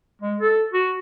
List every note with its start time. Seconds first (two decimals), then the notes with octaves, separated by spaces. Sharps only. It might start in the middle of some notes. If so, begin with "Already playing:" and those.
0.22 G#3
0.40 A4
0.73 F#4